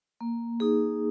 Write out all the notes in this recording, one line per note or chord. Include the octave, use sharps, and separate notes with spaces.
A#3
D#4 G#4